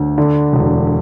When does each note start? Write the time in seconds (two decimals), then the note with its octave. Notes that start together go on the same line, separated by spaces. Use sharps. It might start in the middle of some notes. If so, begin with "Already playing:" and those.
Already playing: D2
0.18 D3
0.53 E1